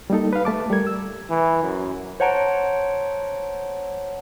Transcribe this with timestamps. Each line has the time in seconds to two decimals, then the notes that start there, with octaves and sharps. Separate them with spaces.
0.10 G3 A#3 D#4 A4
0.33 B4 F5
0.45 A3 A5 D6
0.70 G3 A4 A#4 G#6
0.87 E6
1.30 E3
1.63 F#2
2.20 C5 C#5 F#5 A5 A#5 D7